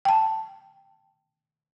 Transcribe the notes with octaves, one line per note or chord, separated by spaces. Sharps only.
G5 A5